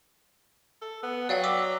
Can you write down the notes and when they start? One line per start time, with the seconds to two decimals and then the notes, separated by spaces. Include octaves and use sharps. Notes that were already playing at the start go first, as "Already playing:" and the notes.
0.82 A4
1.03 B3
1.29 F#3 D5 F5 G5
1.44 D6 E6 B6